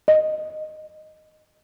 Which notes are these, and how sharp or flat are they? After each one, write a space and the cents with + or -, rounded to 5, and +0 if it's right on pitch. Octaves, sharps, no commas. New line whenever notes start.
D#5 -5